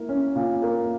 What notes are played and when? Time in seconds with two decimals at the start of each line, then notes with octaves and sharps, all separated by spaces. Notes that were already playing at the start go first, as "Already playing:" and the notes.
Already playing: A#3 E4
0.09 C#4
0.36 A#2
0.62 A#3